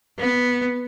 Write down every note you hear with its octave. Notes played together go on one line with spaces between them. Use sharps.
B3